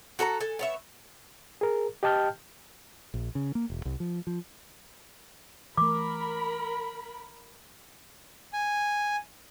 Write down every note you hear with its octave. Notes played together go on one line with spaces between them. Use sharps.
F#4 A4 C#5 A#5
A4 G#5
B3 C#5 E5
G#4 A#4
G4 D#5 G5 A5 F6 G6
A#1
C#3
A#3
E1
C2
F3
F3
E3 A3 A#4 B5 D6
G#5